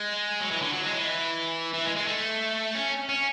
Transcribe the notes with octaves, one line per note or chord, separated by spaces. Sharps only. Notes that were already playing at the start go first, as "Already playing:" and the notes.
Already playing: G#3
F#3
E3
D3
F#3
G#3
E3
E3
G#3
G#3
A3
C#4
C#4